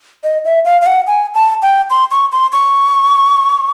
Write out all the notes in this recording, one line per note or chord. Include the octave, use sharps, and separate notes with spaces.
D#5
E5
F5
F5
F#5
G#5
A5
G5
C6
C#6
C6
C#6